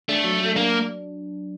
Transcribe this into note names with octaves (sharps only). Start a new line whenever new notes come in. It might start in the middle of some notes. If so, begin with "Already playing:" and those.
A3 D4
F#3
F#3
A#3 D4